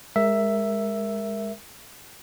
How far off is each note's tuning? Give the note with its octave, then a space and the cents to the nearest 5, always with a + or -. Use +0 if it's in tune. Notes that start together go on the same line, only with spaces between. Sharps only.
G#3 -15 A#4 +0 E5 +5